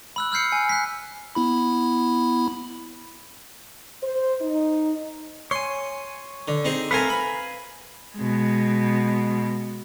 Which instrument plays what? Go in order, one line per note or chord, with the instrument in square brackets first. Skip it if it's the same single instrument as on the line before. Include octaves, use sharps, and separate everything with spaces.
[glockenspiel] B5 E6 F#6
E6 F6 G6 C7 C#7
G#5
F#6 B6
[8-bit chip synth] B3 E4 B5
[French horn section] C5
D#4
[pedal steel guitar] C#5 G#5 [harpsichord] C6
[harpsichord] D3
C4 D#4 G#4
[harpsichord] A3 C4 A#4 [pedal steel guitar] B4 F5 G#5
[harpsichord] B5
[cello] B2 G#3